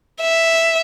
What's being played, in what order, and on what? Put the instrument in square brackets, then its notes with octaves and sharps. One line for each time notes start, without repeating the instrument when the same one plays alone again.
[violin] E5